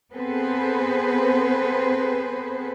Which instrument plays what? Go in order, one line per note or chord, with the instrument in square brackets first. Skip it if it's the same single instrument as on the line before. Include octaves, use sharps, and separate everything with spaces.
[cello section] B3 C4 G#4 A4 B4 C5